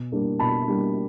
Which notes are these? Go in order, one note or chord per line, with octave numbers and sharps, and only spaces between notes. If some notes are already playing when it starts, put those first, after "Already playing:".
Already playing: B2
G3 A#3 D4
B2 A5 B5
G3 A#3 D4